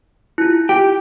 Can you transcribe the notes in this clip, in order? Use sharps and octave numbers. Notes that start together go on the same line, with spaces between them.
E4 F4
G4